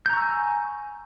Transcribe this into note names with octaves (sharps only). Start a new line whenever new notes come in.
G#5 A#5 C#6 E6 G6